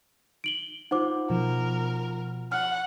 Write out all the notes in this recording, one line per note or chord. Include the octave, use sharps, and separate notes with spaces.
D7 F#7 G7
D#4 F4 C5 F#5 D6
B2 F3 A#4
F#5 F6